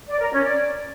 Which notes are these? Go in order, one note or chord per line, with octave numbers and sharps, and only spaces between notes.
D5
A#4
C#4
D5